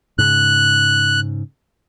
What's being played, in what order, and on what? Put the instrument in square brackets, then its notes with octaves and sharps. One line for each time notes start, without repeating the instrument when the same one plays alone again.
[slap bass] G#2 C#3 [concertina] F#6